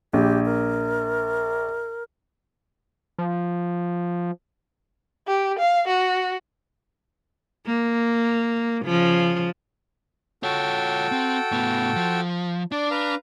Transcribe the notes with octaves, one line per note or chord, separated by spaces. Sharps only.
A#1 G4
A#4
F3
G4
F5
F#4
A#3
C#3 F3
F4 F#4 A4 C#5 G5
C4
A2 B3
F3
D4 D5
B4 F5 A#5